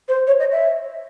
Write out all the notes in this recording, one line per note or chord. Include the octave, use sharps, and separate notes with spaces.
C5
C#5
D#5
E5